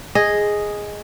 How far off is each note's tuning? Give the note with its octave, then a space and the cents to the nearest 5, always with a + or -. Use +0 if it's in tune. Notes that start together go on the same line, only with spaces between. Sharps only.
G#4 +0 D#5 +0